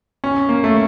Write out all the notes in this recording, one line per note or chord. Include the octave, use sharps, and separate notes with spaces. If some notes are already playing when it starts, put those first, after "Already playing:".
C#4
A#3
A3